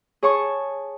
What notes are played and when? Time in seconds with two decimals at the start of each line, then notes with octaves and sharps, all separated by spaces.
0.23 G#4 C#5 A5 C#6